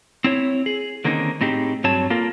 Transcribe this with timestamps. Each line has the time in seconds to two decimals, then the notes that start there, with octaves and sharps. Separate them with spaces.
0.24 C4 E4 C#5
0.66 G#4
1.04 D3 D#3 A#3 C4 C#4 D#4
1.41 A2 C4 D#4 G4 G#4
1.84 G2 F#3 C4 C#5 A5
2.10 A#3 F4 A4 A#4